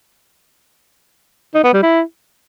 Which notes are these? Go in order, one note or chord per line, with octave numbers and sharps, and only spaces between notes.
D#4
B3
G3
E4